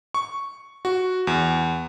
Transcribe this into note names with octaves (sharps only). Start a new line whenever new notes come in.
C#6
F#4
E2